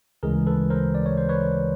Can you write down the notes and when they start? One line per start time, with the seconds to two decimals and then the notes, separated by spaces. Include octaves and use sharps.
0.23 D2 C#3 E3 G#3 G#4 A#4
0.47 A4 B4
0.70 A#4 C5
0.95 D5
1.06 C#5
1.18 C5
1.29 B4 C#5